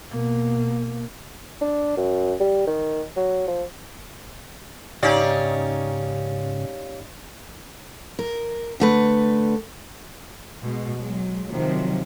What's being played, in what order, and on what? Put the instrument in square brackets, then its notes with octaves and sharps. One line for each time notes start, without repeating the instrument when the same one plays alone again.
[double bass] B2 A#3
[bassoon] D4
F#2
G3
D#3
F#3
F3
[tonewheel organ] G#2 C#3 [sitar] C#4 D#4 D5 [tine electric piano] G4 C#5 F5
[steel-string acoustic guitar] A#4
D3 A3 B4
[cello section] B2 G#3
F#3 G#3
C3 D#3 F3 F#3